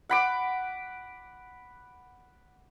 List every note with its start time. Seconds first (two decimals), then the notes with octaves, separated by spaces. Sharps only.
0.09 F#5 B5 D6